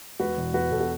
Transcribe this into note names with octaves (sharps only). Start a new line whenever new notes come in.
E1 F#4 B4
E2 B2
E1 F#4 B4
E2 B2 A4
F#4